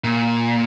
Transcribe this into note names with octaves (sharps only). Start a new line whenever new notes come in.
A#2